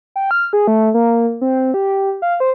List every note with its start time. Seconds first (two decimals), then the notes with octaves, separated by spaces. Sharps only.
0.16 G5
0.31 F6
0.53 G#4
0.68 A3
0.94 A#3
1.41 C4
1.74 G4
2.22 F5
2.40 C5